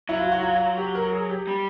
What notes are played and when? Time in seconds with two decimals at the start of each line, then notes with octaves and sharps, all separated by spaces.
0.09 F#3 E4
0.20 F4
0.32 F#4
0.43 F4
0.55 F4
0.78 G4
0.95 A#4
1.12 G#4
1.30 G4
1.47 G3